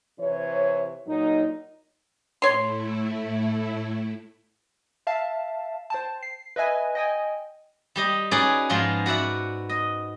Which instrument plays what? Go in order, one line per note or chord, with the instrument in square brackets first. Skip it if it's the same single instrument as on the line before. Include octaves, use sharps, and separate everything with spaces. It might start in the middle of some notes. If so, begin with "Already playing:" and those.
[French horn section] C3 E3 C#5
A#2 F#3 D#4
[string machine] A2 A3 E4 [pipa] C#5 C6
[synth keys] E5 F5 A5
C5 G5 A5
C7
B4 D#5 E5 G#5
D#5 G5 G#5
[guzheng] G3 G4 D#5
C#4 D#4 F#4 G#4 B4 D5
G#2 F3 G#3 B3 F4
F#4 B4 D5 E5 F#5
D#5